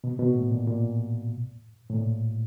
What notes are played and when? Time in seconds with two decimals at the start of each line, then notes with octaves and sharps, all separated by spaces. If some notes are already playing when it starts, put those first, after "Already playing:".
0.04 B2
0.19 B2
0.29 A#2
0.35 A2
0.51 A#2
0.67 A#2
1.90 A2
1.94 A#2